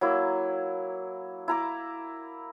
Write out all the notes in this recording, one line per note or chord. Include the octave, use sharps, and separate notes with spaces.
F#3 A#3 E4
E4 A#5 D6